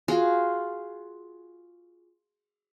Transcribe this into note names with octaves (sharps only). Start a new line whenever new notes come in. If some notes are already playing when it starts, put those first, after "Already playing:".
F4 F#4 G#4